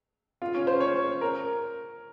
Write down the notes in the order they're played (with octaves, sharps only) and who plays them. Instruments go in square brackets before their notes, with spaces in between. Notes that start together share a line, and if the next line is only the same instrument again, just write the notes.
[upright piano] F4
C#4
C5
C#5
A#4